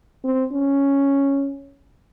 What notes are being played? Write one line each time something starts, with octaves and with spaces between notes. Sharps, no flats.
C4
C#4